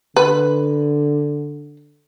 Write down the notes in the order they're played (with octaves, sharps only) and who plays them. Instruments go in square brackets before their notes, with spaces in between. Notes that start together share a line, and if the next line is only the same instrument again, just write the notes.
[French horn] D3 [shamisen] B4